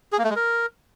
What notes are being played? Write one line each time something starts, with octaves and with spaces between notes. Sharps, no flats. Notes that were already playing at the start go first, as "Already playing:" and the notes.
G#4
A#3
A3
G#3
A#4